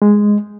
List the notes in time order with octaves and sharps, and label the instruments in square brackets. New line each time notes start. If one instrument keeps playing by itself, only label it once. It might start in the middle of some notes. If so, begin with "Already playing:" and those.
[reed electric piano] G#3